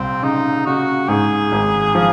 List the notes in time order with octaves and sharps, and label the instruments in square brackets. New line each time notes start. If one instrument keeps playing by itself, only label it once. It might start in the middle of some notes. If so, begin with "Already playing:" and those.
Already playing: [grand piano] C2 A#2 [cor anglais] C4
[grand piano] C#3 [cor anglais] D#4
[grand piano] C#3 [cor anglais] F#4
[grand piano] G#2 [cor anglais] G#4
[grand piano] G#1
F3